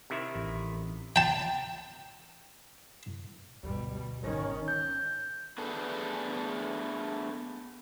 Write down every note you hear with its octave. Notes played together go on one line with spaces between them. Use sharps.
C3 D#3 E4
A1
G5 A5
D2 G2 B2 G3
G#1 D#3 C#4
G6
A3 B3 D4 G#4 A4